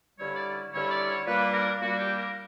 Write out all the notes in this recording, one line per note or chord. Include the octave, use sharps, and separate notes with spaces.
G2 D3 G3 C#4 E4 C#5
D5
G2 D3 G3 C#4 E4 C#5
D5
C#5
A#2 G3 A#3 D4 B4
A#4
A#2 G3 A#3 D4 F#4
G4
A#4